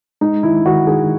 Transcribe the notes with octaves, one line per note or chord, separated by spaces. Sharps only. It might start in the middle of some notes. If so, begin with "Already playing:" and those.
G#3 D#4
D#3 E4
D#3 F#4
D#4 G#4